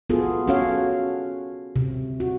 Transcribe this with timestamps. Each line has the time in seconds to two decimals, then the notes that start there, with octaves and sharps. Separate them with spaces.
0.10 B3 F4 F#4 G#4 A4
0.48 C#4 F#4 A4 C#5 F5
1.76 C3
2.20 F#4